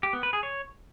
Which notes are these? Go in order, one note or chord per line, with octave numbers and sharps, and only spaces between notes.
G4
B3
B4
G#4
C#5